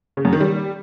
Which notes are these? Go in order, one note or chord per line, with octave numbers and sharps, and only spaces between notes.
C#3
F#2
D#3
G3